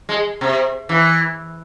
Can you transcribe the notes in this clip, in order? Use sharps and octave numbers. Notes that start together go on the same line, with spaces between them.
G#3
C3
E3